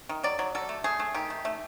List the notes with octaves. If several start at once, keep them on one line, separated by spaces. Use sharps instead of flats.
D#3
F#3 D5
F#3
F#3 A4
A3
A3 G#4
A3
D#3 G4
A3
A3